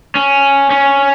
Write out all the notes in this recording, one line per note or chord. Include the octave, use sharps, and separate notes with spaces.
C#4
C#4